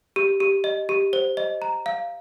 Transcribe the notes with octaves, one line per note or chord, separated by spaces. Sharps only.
G4
G4
D#5
G4
C5
D#5
A#5
F5